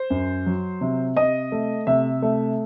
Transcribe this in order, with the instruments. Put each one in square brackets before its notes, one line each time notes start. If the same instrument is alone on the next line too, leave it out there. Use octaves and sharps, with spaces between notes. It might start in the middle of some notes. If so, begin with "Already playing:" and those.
Already playing: [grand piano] C5
F#2
F#3
C3
C3 D#5
A3
C3 E5
A3